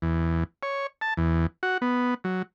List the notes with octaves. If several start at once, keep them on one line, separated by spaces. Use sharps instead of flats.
E2
C#5
A5
E2
F#4
B3
F#3